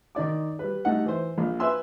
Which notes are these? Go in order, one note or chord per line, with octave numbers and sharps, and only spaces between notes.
D#3 D#4 D5 D6
G3 B4
G3 A3 D#4 F#5
E3 C5
A#1
B4 E5 G#5 C6 E6